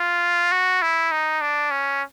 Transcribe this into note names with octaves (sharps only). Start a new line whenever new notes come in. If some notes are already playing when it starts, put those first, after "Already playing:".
Already playing: F4
F#4
E4
D#4
D4
C#4